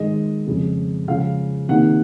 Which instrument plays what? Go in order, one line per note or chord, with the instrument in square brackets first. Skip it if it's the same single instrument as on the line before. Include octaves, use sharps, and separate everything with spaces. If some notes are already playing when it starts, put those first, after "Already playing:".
Already playing: [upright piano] G#2 D#3 G#3 D#5
F2 C#3 G#3
C#3 F3 G#3 F5
C3 D#3 A#3 D#4 F#5